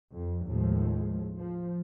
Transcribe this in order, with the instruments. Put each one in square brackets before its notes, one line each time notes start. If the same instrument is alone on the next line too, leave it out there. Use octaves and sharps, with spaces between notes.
[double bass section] F2
D#2 A2 F3 G#3
F3